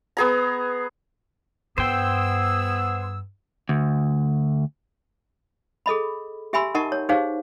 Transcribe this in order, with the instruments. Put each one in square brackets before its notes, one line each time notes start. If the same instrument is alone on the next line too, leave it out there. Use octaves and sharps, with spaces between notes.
[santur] B3 G#4 A#5
[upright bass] G2 [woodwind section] B3 G#4 E6 [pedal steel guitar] C5 G5
[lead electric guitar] D2
[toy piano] G#4 A4 D#5 B5
G4 E5 G#5 B5 C6 E6
D#4 A#4 D#5 F#5 A5 C#6
C#5
D#4 G4 G#4 C5 C#5 F5